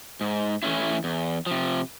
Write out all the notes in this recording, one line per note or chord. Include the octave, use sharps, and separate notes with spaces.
G#2
E3 A3 C#4 E4
E2
C3 F3